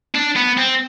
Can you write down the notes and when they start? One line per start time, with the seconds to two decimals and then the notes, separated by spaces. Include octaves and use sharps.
0.15 D4
0.36 B3
0.58 C4